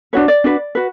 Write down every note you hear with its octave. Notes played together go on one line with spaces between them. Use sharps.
D4 F#4 B4 C#5
D5
D4 F#4 B4
F#4 B4